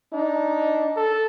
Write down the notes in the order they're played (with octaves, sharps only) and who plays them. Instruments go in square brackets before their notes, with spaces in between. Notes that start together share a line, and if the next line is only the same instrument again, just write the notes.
[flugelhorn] D4 [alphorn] D#4
[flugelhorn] A4